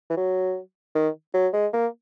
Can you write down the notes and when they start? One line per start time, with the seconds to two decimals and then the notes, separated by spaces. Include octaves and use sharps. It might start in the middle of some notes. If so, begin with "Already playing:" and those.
0.10 E3
0.17 F#3
0.95 D#3
1.34 F#3
1.53 G#3
1.73 A#3